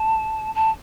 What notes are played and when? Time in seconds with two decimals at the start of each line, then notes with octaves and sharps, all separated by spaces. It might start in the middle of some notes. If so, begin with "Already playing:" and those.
Already playing: A5
0.55 A5